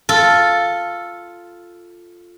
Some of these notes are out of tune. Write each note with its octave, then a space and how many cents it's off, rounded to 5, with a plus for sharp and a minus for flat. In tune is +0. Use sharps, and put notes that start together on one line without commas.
F4 +0 A4 +0